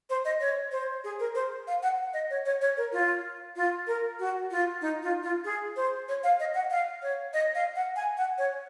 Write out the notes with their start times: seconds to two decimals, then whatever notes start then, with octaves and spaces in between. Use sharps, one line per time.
0.10 C5
0.25 D#5
0.41 C#5
0.72 C5
1.04 G#4
1.20 A#4
1.35 C5
1.67 F5
1.83 F#5
2.14 D#5
2.30 C#5
2.45 C#5
2.61 C#5
2.77 A#4
2.93 F4
3.56 F4
3.87 A#4
4.19 F#4
4.51 F4
4.81 D#4
5.03 F4
5.23 F4
5.45 G#4
5.76 C5
6.08 C#5
6.24 F5
6.40 D#5
6.55 F#5
6.71 F5
7.02 C#5
7.33 D#5
7.55 F5
7.76 F#5
7.96 G#5
8.17 F#5
8.38 C#5